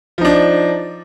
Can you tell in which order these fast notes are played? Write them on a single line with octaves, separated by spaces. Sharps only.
F3 D#4 D4